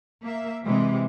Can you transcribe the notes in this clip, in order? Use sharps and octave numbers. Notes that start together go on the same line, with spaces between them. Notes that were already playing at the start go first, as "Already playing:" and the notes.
A#3 E5
C3 E3 G#3